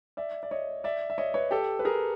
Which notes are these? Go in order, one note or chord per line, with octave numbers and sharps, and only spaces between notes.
D5 E5
D5
C#5 D#5
D5 E5
E5
C#5 D#5
B4 C#5
G4 A4
B4
G#4 A#4